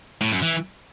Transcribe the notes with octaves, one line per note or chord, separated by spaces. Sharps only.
A2
F#2
E3